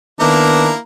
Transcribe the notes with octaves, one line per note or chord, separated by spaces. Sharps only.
D#3 A#3 B3 D4 E4 A#5